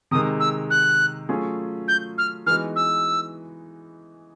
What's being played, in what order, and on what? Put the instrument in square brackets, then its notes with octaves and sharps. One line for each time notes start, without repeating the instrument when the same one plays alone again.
[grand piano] C3 D#3 G#3 [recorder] D#6
[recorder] E6
F#6
[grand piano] F#3 A3 C#4 F4 G#4
[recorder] G6
F6
[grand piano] E3 G#3 B3 D#4 F#4 [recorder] F6
[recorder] E6